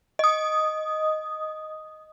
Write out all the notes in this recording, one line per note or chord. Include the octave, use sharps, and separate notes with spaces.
D#5 D#6